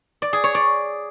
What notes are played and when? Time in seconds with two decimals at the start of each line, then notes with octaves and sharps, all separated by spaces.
0.22 D5
0.33 G#4
0.44 C#5
0.55 D5